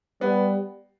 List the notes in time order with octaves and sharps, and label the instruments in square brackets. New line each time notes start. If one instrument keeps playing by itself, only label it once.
[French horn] G3 [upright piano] B3